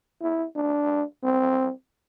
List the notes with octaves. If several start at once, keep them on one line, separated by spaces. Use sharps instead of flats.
E4
D4
C4